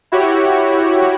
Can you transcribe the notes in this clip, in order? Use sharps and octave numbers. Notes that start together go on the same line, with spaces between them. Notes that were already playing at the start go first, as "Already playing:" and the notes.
E4 F#4 G4 C#5